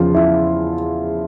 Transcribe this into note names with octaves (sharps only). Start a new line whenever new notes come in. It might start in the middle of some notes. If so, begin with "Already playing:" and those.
Already playing: E2 C#3 F3 F4
E4